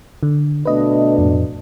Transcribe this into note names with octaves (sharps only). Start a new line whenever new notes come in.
D3
B2 A3 D4 B4 D#5
F2 A2